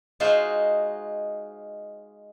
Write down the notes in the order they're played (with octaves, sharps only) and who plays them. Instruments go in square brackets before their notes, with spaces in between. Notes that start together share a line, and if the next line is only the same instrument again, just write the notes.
[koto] G#3 D#4 F4 F#4 C5